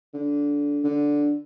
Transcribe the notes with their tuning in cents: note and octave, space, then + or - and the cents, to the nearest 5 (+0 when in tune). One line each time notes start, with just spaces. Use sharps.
D3 -20
D3 -5